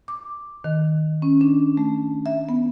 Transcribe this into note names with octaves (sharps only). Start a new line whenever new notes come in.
D6
D#3
C#4
D4
A3
E5
B3